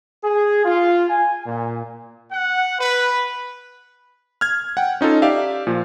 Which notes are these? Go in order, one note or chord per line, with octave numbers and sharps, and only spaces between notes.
G#4
F4
G#5
A#2
F#5
B4
F6 G#6
F#5 G5
C#4 D#4 F4 A4
G4 D5 E5 F5
A#2 F3